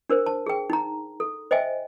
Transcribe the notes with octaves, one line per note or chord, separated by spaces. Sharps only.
D4 A#4 C5
A5
G#4 G5
D#4 A#5
A4
C5 D#5 E5 G5 G#5